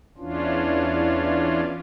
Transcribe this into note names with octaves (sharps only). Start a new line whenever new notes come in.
E2 E3 C#4 D4 F4